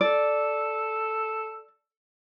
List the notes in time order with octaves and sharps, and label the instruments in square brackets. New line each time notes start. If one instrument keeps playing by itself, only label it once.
[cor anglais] A4 [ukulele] D5